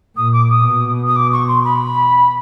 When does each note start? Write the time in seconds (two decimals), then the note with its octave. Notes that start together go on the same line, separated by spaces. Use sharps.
0.17 A#2 D#6
0.33 D6
0.49 D#6
0.66 B2
1.07 D#6
1.16 D6
1.32 C#6
1.48 C6
1.64 B5